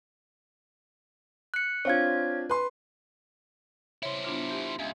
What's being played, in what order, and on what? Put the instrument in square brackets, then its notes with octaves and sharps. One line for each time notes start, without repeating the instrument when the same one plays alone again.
[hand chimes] F#6 C#7
[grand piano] C4 D4 F4 [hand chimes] C#5 F5 G#6
[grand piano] B4 C6
[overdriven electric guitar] E4 C5 [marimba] C#5 C6
[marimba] B3 D4 F4
G4
[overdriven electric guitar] C#2 [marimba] E5 G#5